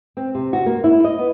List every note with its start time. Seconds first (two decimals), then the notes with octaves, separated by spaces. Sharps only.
0.17 C4
0.35 C3
0.53 F#4
0.66 A#3
0.84 E4
1.04 D#5
1.19 B3